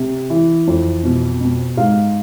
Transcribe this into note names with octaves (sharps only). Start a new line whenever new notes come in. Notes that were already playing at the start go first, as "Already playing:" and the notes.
Already playing: C3
E3
F2
B2
B2
G#2 F5